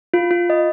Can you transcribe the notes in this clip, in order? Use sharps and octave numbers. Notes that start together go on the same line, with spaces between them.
F4
F4
D#5